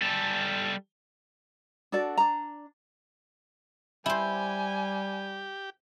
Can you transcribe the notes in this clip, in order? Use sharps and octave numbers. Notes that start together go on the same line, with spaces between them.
G3 A4
D4 F#4 A4 D5
D4 A#5
G3 E4 G4 C5 G#5